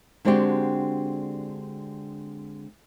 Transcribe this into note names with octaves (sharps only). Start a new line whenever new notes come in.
D3 G#3 C4 D4 F#4 G4